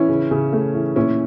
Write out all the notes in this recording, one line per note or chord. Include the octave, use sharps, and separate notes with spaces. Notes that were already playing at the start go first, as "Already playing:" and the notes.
Already playing: E3 C#4 E4
C#3
C#3
A3
E3
A#2 C#4 E4